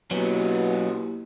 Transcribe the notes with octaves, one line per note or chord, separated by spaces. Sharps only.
B2 F#3 A#3 B3 C#4 E4 G4